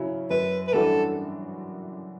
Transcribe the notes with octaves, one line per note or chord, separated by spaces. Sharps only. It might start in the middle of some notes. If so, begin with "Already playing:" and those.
Already playing: C#3 F#3 C#4 E4
F#2 B4
B4
E3 G3 D4 F#4 A4